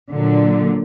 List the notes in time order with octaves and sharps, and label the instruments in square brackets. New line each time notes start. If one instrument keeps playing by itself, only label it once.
[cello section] A#2 D3 F#3